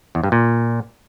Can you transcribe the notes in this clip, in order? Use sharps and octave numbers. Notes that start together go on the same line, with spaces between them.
E2
G2
A#2